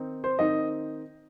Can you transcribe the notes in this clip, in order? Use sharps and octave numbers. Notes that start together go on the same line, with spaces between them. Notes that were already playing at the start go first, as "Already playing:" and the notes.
Already playing: D#3 C4 D#4
C5
D#3 C4 D#4 D#5